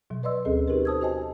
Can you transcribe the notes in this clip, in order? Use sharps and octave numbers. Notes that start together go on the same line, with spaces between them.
B2 F#3
B4 D5 D#5 C6 E6
D2 C4 C#4 G#4 A4 D#5
D#4 G4 G#4 A#4 B4
A4 C5 A5 D#6 E6 G#6
F#4 C5 D#5 G#5 A5